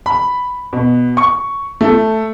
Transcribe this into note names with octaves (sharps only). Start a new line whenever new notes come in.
B5
B2
C#6
A3